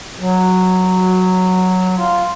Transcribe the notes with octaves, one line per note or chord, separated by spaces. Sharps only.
F#3
F4